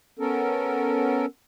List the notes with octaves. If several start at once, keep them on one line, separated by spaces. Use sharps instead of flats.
B3 C#4 A4 A#4